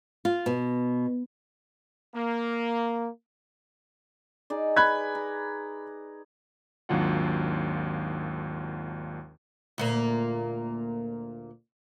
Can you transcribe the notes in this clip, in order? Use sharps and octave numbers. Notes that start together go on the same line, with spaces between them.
F4
B2
A#3
D#4 G#4 D5
B4 B5 F#6 G#6
A#5
G#1 D#2 F#3 D4 F4 F#5
D2 A#2 A#3